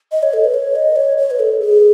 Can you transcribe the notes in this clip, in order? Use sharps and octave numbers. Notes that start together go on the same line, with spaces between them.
D#5
C#5
A4
B4
C#5
D#5
C#5
C#5
B4
A4
G#4